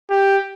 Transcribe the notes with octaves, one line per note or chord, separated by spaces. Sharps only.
G4